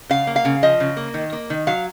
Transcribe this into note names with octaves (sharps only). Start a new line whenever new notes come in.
C#3 F5
A#3
F5
C#3
F3 D#5
C#3
A#3
D#3
A#3
D#3
F#3 F5